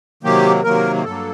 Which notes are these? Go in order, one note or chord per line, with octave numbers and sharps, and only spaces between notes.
C3 D#3 F#3 A#3 G4
C3 D#3 F#3 A#3 A#4
G2 F#3 A#3 A4